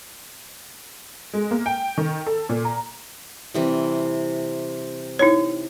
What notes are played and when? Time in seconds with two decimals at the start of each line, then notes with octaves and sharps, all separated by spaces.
1.33 G#3
1.51 A#3
1.66 G5
1.98 D#3
2.27 A4
2.49 A#2
2.65 A#5
3.54 C3 E3 G3
5.19 D#4 E4 C#5